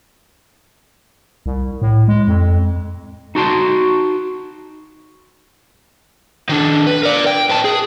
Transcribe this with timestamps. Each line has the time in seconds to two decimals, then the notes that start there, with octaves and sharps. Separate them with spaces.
1.46 C2
1.82 A2
2.08 G#3
2.28 F2
3.35 D#4 F#4 A5 C6
6.50 D#3 D4
6.87 B4
7.03 A#4 D5
7.26 G5
7.50 B3 A5
7.65 G#4